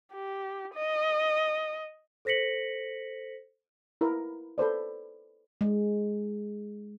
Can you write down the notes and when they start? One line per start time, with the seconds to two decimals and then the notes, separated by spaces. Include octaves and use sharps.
0.14 G4
0.75 D#5
2.25 A4 C5 A#6 B6 C#7 F#7
4.01 E4 A#4 B4
4.58 A4 B4 C5 D5
5.61 G#3